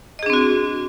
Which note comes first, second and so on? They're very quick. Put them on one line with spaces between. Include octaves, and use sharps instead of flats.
D#5 G#4 D4 C4 F#4